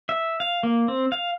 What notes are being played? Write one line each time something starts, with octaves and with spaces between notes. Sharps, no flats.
E5
F5
A#3
C4
F5